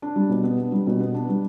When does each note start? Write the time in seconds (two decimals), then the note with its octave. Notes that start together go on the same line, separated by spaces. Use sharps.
0.02 D4
0.16 G3
0.29 B2
0.44 B3
0.58 D4
0.72 G3
0.87 B2
1.00 B3
1.14 D4
1.29 G3